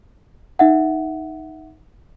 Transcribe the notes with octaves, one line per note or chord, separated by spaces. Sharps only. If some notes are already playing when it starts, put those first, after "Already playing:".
D#4 E5 F#5